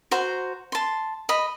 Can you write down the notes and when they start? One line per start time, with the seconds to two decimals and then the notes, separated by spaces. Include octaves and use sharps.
0.11 F#4 C5 A#5
0.72 A5 C6
1.29 D#5 B5